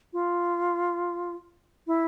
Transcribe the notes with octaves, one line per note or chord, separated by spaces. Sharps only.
F4
E4